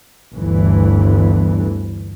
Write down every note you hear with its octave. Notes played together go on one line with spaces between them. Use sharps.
G1 D2 E3